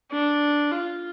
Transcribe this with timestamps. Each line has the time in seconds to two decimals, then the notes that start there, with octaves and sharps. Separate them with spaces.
0.12 D4
0.72 F4